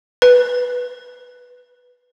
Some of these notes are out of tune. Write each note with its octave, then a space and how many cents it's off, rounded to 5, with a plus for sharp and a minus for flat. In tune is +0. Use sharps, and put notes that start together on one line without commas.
B4 +0